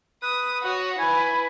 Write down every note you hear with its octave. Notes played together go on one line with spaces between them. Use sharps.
B4 D#6
F#4 C#5
E4 B4 G#5